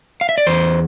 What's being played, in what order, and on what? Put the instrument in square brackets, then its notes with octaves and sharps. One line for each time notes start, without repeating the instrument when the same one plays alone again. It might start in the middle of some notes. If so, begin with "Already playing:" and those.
[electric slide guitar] F5
E5
D5
E2 C5